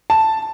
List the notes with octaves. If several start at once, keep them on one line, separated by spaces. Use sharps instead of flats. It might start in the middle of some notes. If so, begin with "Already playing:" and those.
A5